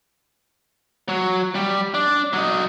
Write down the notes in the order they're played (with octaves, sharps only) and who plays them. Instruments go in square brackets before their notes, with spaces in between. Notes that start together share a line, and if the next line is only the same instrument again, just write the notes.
[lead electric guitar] F#3
G3
D4
F#3 D#5